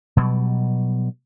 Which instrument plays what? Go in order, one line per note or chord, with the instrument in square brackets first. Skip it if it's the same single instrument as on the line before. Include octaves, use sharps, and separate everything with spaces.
[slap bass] B2 F#3 G3